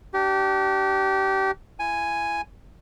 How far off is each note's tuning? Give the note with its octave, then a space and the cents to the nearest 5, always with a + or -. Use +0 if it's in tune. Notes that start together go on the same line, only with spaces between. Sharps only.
D4 +0 G4 -25
E4 +35 G#5 +0